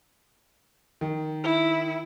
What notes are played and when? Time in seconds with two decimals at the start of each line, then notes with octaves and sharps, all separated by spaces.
1.01 D#3
1.44 E4